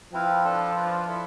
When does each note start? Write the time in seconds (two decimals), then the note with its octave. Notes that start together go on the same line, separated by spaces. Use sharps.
0.13 F3 C4 E4 B4 F5
0.44 D4 F4 A4
0.76 D4 F4 B4 D5
1.07 E4 A4 E5